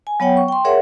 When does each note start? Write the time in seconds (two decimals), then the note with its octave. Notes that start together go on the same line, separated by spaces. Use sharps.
0.07 G#5
0.20 F#3 B3 C#5 F#5 G5
0.37 C#6
0.48 G5 C6
0.65 G#4 A#4 C#5 E5 F#5